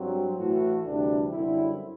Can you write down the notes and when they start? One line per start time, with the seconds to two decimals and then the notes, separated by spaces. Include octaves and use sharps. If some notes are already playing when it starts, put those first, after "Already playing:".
Already playing: G2 F#3 C4
0.37 A2 E3 A3 F#4
0.85 D2 C3 E3 G3 D4
1.32 F#2 D3 G3 C4 E4